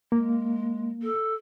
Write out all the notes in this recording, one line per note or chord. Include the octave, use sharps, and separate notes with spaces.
G#3 A#3
A4